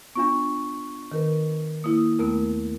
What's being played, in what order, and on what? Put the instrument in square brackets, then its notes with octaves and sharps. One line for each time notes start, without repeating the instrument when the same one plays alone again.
[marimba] B3 [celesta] D4 F4 C#6
[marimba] D#3 A#4 B4
[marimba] A#3 E4 [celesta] D#6
[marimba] D#2 A3 B3 [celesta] A#4